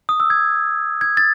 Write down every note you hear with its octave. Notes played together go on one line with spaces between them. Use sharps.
D#6
E6
G#6
G#6
A6